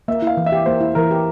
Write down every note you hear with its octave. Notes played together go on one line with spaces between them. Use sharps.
A#3 E5
E4 F5
E3
E5
G4
A#3 C5
E4
E3 A#4
G4